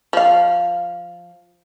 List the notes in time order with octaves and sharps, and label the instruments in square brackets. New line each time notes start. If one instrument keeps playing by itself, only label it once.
[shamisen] F3 F5